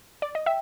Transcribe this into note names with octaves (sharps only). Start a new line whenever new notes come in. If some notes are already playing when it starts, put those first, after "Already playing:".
D5
D#5
E5 G5